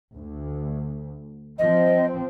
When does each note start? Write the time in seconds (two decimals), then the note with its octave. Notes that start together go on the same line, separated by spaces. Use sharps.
0.13 D2
1.59 F3 C4 D#5